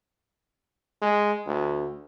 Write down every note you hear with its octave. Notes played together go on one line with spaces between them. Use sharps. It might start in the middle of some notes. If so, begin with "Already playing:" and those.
G#3
D2